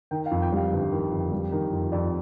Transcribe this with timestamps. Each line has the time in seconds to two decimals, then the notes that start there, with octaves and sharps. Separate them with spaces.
0.11 D#3 G5
0.26 F5
0.31 F2
0.42 G5
0.52 G3 F5
0.72 G1
0.92 D#3
1.12 F2
1.32 G3
1.52 D#3
1.72 F2
1.92 F2 D5